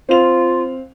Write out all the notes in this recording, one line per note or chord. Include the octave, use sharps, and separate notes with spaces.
C4 F4 F5 F7